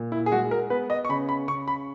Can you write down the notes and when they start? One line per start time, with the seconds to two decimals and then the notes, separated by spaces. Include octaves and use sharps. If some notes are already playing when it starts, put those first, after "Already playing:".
Already playing: A#2
0.12 E4
0.26 G#4
0.32 G#3 F#4
0.51 A#4
0.70 B3 B4
0.90 D#5
1.05 C#6
1.09 C#3 B5
1.29 B5
1.48 C#3 C#6
1.68 B5